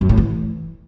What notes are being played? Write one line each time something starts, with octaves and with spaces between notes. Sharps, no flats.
F#2
A2
E3